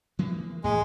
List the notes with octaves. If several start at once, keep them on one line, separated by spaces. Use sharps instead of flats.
E3 G#3 A#3
D#2 A2 G#3